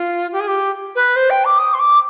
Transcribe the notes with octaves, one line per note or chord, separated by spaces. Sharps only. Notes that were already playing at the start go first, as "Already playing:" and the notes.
Already playing: F4
G4
G#4
G4
B4
C5
G5
D6
D#6
C6
D6